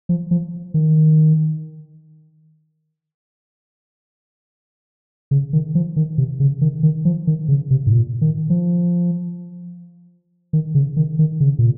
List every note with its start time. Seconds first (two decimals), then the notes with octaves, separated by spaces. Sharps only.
0.09 F3
0.31 F3
0.74 D#3
5.31 C#3
5.53 D#3
5.75 F3
5.96 D#3
6.18 C3
6.40 C#3
6.61 D#3
6.83 D#3
7.05 F3
7.27 D#3
7.48 C#3
7.71 C3
7.86 G#2
7.92 A#2
8.21 D#3
8.50 F3
10.53 D#3
10.75 C#3
10.97 D#3
11.19 D#3
11.40 C#3
11.59 A#2